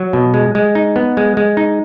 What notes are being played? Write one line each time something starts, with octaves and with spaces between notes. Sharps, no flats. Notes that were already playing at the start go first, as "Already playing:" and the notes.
Already playing: F#3
B2
G#3
G#3
D#4
B3
G#3
G#3
D#4